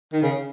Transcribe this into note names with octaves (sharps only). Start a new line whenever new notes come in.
D#3
C#3